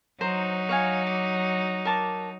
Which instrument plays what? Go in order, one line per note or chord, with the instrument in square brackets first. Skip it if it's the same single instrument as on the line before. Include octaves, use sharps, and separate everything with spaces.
[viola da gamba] F#3 D#4 [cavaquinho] C5 A#5
[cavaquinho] C#5 F5 G#5
D6
A#4 A5 D6